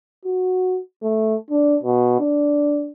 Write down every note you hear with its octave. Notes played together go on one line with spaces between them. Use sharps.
F#4
A3
D4
B2
D4